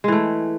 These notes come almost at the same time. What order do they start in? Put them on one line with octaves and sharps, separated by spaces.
G#3 E3 A3